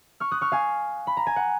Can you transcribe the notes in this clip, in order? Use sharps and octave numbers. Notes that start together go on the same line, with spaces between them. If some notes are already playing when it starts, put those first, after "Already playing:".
C#6 F6
D#6 F#6
C#6 F6
F5 G#5
B5
A#5
G#5
F#5